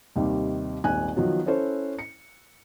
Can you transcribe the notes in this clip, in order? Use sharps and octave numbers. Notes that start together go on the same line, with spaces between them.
D#2 C3 D#3 G3
D#1 G#1 G#5 F#6
D#3 F3 F#3 B3
C#4 E4 A4 C5 C#5
C#7